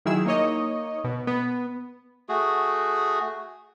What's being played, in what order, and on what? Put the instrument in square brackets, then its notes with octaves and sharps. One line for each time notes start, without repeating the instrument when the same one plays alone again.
[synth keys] D#3 F#3 E4 G#4 E6
A#3 D#4 C#5 D#5
B2
B3
[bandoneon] A3 F#4 G#4